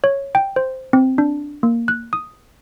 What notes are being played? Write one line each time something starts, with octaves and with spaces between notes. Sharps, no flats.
C#5
G5
C5
C4
D4
A#3
F#6
D#6